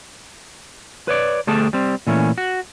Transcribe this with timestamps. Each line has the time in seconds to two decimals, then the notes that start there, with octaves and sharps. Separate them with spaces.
1.08 B4 C#5 D5
1.47 D2 G3 A3 D4 G#4 A5
1.73 G3 C4
2.07 A#2 E3 A3 C#4
2.38 F#4